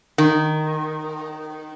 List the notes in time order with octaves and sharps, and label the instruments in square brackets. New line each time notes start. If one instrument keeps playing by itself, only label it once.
[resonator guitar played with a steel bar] D#3